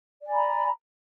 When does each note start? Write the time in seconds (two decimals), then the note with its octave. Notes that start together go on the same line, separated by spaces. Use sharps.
0.22 D5
0.27 G#5
0.32 B5
0.36 A#5